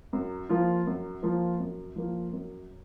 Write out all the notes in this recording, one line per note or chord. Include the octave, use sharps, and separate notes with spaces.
F#2
F3 A#3 F4
F#2
F3 A#3 F4
F#2
F3 A#3 F4
F#2